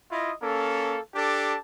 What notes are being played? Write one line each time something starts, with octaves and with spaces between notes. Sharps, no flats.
E4 F4 D#5
A#3 C#4 A4
D4 G4 A4 A5